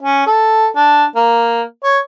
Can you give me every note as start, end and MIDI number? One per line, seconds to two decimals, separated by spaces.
0.02 0.25 61
0.26 0.67 69
0.75 1.04 62
1.15 1.62 58
1.84 1.98 73